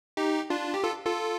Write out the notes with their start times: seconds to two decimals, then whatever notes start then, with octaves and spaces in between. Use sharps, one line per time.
0.17 D#4 G4
0.50 D4 F4
0.74 G4
0.84 F4 A4
1.06 F4 A4